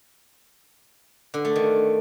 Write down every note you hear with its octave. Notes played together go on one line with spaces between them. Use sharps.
D3
A3
D#3